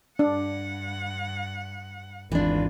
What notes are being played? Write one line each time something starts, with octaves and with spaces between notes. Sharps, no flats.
G2 D4 F#5
G#1 E2 D3 E3 D4 F4